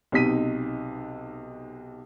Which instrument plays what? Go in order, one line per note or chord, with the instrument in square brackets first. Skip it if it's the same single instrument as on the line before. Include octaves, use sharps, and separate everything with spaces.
[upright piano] B1 C3 D#4 B6 D#7